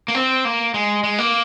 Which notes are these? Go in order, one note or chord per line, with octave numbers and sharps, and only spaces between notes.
A#3
C4
A#3
G#3
G#3
A#3